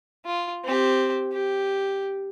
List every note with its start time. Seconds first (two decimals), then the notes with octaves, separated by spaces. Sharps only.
0.25 F4
0.65 C4 G4
1.32 G4